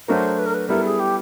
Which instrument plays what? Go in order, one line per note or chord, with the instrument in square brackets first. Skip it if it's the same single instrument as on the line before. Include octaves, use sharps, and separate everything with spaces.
[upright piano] F#3 A3 D4 F#4 A#4 [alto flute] C5
[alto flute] B4
A#4
B4
[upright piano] G3 B3 E4 A4 [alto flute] A#4
[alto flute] G#4
G4